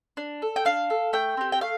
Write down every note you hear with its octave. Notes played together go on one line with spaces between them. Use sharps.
D4
A4
G5
D4 F5
A4
A3 G5
C4 G4
G5
A3 F5